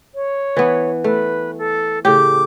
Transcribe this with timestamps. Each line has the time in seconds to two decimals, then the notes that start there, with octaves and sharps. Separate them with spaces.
0.15 C#5
0.57 E3 B3
1.04 A3 B4
1.58 A4
2.05 A2 C#3 G4 D6